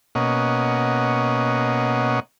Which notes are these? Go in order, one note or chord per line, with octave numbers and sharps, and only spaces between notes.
B2 A#3 C#4 D#5 F#5